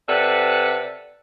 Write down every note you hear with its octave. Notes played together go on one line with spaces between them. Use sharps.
C3 A4 B4 D5 F#5